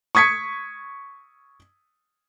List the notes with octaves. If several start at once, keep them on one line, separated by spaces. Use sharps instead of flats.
C#6 D#6 G#6 B6 C#7